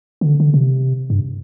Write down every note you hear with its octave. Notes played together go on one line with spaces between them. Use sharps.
D#3
D3
D3
C3
G2